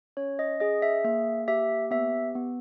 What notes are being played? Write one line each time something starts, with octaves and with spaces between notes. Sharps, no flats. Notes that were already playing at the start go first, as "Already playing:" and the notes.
C#4 C#5
D#5
G#4 D#5
E5
A#3 E5
G4 E5
B3 E5
B3